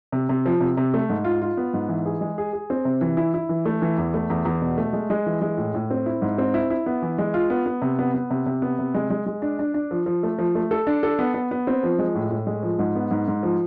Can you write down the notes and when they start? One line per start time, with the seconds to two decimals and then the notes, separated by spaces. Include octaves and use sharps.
0.12 C3
0.29 C3
0.46 F3
0.60 C3
0.77 C3
0.94 A3
1.09 G#2
1.25 F4
1.42 F4
1.57 B3
1.74 G#2
1.89 E3
2.06 G#4
2.21 G#3
2.38 G#4
2.53 G#4
2.70 C4
2.85 C3
3.01 E3
3.17 E4
3.34 E4
3.49 E3
3.66 A3
3.82 E3
3.98 E2
4.14 A3
4.30 E2
4.45 E2
4.61 B2
4.78 A3
4.93 G#3
5.10 G#3
5.26 E3
5.41 G#3
5.57 A2
5.74 A2
5.90 C4
6.06 E4
6.22 G#2
6.38 C4
6.54 E4
6.70 E4
6.86 B3
7.02 E3
7.18 G#3
7.34 F4
7.50 B3
7.66 B3
7.82 C3
7.99 B3
8.14 B3
8.30 C3
8.46 C3
8.62 B3
8.79 C3
8.94 G#3
9.10 G#3
9.26 G#3
9.42 D4
9.59 D4
9.74 D4
9.91 F3
10.06 F3
10.23 A3
10.39 F3
10.55 A3
10.71 A4
10.87 D4
11.03 A4
11.19 B3
11.34 B3
11.51 B3
11.67 C4
11.83 F3
11.99 G#3
12.15 A2
12.30 A2
12.47 G#3
12.63 F3
12.79 G#2
12.95 B3
13.11 G#2
13.28 G#2
13.43 F3